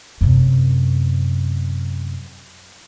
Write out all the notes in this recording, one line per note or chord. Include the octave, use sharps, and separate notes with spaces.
F#2 C3